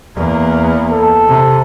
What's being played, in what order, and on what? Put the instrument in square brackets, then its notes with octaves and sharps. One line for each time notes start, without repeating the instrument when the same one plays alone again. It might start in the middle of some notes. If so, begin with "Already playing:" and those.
[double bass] E2 A#3
[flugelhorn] A4
[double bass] C3